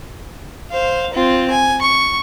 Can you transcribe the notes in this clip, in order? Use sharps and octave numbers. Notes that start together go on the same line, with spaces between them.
C5 F5
C4 F4
G#5
C#6